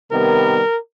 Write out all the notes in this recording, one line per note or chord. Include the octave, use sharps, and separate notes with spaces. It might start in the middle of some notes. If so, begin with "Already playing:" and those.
C3 D#3 G3 B3 A#4